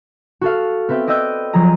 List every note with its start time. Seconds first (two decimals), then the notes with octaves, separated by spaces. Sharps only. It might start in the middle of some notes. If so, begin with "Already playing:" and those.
0.41 F#4 A4 F5
0.89 B3 C4 B4 E5 G5
1.07 D5 D#5 G5 E6 F#6 G6
1.53 F3 F#3 G#4 A#5 D#7